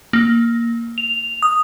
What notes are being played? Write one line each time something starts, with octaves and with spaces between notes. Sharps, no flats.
A#3
F7
D#6